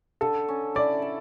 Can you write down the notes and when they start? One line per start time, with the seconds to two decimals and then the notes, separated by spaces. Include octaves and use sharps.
0.21 D3 A4
0.48 C#4
0.75 E4 D5
1.02 A4